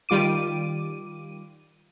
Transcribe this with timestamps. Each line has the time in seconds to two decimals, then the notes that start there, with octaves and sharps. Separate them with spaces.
0.09 D#3 G3 F4 D6 D#7